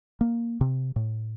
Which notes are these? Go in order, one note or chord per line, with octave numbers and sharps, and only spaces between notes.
A#3
C3
A2